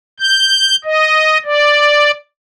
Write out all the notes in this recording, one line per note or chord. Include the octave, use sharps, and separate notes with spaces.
G6
D#5
D5